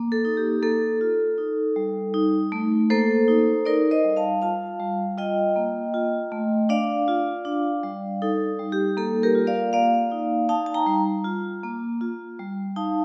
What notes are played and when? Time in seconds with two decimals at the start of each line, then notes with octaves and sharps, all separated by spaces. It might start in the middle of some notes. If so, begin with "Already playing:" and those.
Already playing: A#3
0.12 A4
0.25 D#4
0.37 G4
0.62 A#3 A4
1.01 F4
1.38 D#4
1.76 G3
2.14 D#4
2.52 A3
2.90 A#3 A4 C5
3.28 D#4
3.66 D#4 A#4 D5
3.91 C5 D#5
4.04 G3
4.16 F5 A5
4.42 F4 F5 A5
4.80 G3
5.18 F4 D#5 G5
5.56 A#3
5.94 F4
6.32 A3
6.69 D4 D5 F5
7.08 F4
7.45 D4
7.83 G3
8.22 D#4 A4
8.59 G3
8.72 G4
8.97 A#3 A4
9.23 G4 A#4
9.35 F4
9.47 D5 F5
9.73 A#3 D5 F5
10.12 D#4
10.49 D#4 F5 A5
10.66 A5
10.74 G5 A#5
10.87 G3
11.25 F4
11.64 A#3
12.01 F4
12.39 G3
12.76 D#4 F5 A5